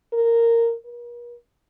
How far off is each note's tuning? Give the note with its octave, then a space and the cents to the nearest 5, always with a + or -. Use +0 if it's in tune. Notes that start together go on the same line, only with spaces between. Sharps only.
A#4 -10
A#4 +45